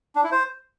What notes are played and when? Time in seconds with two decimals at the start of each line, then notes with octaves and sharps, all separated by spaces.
0.16 D4
0.24 E4
0.32 C5